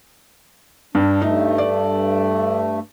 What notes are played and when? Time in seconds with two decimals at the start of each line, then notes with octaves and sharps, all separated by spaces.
0.95 G2 D4
1.22 G2 A3 D#4
1.58 D5